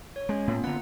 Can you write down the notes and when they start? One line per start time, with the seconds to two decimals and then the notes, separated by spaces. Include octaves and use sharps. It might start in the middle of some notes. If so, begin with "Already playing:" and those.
0.16 C#5
0.29 G#3 C#4
0.47 A2 A#3 B3 F4
0.64 D3 B3 F#5 A#5